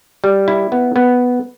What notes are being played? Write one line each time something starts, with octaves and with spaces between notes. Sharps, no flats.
G3
E4
B3
B3